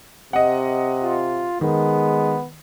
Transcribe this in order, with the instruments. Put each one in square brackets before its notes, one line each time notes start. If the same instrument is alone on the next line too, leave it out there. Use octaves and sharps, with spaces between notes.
[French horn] C3 [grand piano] D#5 F#5
[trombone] F4
[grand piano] D#3 [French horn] G#3 [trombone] B3